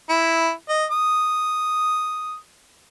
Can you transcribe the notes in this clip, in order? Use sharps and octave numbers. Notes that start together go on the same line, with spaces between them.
E4
D#5
D#6